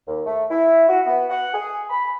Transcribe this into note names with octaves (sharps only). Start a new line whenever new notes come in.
D#2
A3
E4
F#4
B3
F#5
G#4
B5